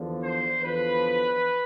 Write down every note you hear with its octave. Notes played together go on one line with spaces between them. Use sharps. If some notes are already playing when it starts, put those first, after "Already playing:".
Already playing: E2 D3 F3
C5
E2 D3 F3 B4